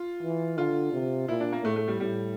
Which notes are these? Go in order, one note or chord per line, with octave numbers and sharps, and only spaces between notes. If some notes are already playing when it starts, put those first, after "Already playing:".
Already playing: F4
E3
D3 F4
C3
A#2 E4
D4
A#3
A2 A3
A3
G3
A2 G3